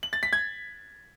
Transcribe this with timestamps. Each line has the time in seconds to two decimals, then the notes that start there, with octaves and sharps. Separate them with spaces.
0.03 F#7
0.13 A6
0.23 B6
0.33 G#6